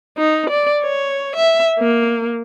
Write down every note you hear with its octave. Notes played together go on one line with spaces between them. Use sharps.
D#4
D5
C#5
E5
A#3